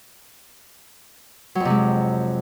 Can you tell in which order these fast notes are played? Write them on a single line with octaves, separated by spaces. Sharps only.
F#3 F2 C3 G#3